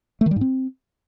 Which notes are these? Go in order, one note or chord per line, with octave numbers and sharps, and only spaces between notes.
A3
D#3
G3
G#2
C4